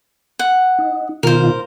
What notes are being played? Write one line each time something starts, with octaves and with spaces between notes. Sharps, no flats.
F#5
D#4
B2 D#3 F4 A#4 C5